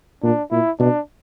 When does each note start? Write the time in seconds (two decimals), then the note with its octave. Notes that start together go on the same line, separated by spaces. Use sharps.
0.23 A#2 D4
0.51 A#2 E4
0.80 B2 D4